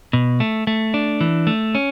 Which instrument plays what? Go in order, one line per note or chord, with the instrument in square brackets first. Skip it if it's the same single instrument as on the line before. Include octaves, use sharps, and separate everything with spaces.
[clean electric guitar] B2
A3
A3
D4
E3
A3
C#4